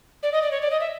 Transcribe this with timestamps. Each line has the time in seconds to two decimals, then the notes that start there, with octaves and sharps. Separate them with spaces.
0.23 D5
0.33 D#5
0.42 D5
0.51 C#5
0.62 D5
0.71 D#5
0.80 E5